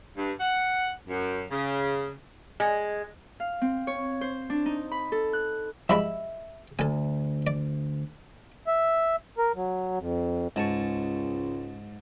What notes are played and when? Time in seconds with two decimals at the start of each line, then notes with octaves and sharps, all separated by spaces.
0.17 G2
0.40 F#5
1.09 F#2
1.51 C#3
2.60 G#3
3.40 F5
3.62 C4
3.87 C#5
4.21 C5
4.50 D4
4.66 D#4
4.91 B5
5.12 A4
5.33 F#6
5.89 F3 G3 G#3 E5 B5
6.79 D2 A4 G#5
7.47 D5
8.67 E5
9.38 A#4
9.56 F#3
9.99 F2
10.56 C#2 G#2 A5 C#6